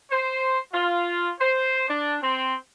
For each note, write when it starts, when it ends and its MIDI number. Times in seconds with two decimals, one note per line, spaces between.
0.11 0.58 72
0.73 1.30 65
1.40 1.84 72
1.89 2.17 62
2.22 2.54 60